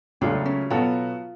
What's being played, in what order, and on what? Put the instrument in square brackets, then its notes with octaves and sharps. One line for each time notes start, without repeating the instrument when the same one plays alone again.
[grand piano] C#2 C#3 F#3 A3 F4 [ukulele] D4
[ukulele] C#4
[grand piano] B2 F#3 B3 F#4 A4 [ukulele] F4